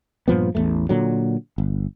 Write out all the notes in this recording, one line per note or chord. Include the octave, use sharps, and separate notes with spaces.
G2 A#2 F3 B3
A1 E2 A2 A3
A#2 D3 F#3
G1